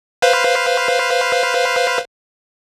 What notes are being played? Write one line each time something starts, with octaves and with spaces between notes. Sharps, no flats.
B4 C5 F5